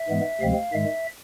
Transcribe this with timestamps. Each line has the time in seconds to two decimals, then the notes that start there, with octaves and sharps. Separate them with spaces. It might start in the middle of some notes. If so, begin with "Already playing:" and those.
Already playing: E5
0.08 G#2 E3 G#3 B3
0.41 D2 C3 F3 G#3 C4 F5
0.73 G#2 D#3 G#3 E5